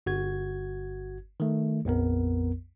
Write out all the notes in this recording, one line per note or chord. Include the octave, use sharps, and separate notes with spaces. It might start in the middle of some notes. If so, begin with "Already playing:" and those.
G1 F#4 G#6
D#3 A3
A#1 F2 B3 A#4